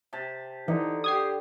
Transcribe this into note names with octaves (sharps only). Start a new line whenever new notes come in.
C3 A5
D3 E3 D#4
G4 D#6 G#6 C7